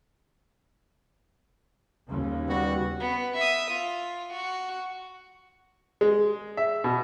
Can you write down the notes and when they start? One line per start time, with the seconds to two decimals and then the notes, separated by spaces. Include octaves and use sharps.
2.09 D#2 C#3
2.48 G3 B3 F#4
3.00 B3
3.37 E5 D#6
3.71 F4
4.33 F#4
6.01 G#3
6.57 E5
6.84 B2